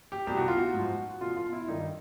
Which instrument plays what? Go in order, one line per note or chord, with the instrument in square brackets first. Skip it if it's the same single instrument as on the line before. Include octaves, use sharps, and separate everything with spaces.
[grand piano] G4
C2 B2 G4
F#4
F4
F#4
G#2 F3
E2 B2 F4
F4
E4
G2 D#3 D#4